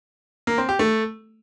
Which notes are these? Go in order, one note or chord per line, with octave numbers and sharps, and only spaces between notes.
A#3
C4
G4
A3